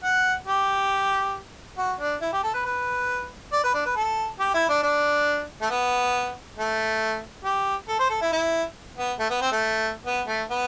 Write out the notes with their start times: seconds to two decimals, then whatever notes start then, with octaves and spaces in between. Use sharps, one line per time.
0.03 F#5
0.47 G4
1.78 F#4
2.00 D4
2.21 E4
2.33 G4
2.44 A4
2.54 B4
2.65 B4
3.52 D5
3.64 B4
3.74 D4
3.86 B4
3.96 A4
4.39 G4
4.54 E4
4.69 D4
4.83 D4
5.62 A3
5.70 B3
6.57 A3
7.45 G4
7.88 A4
8.00 C5
8.10 A4
8.21 E4
8.32 E4
8.97 B3
9.19 A3
9.30 B3
9.41 C4
9.52 A3
10.06 B3
10.28 A3
10.50 B3